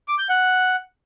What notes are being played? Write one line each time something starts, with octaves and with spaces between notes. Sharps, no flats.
D6
G6
F#5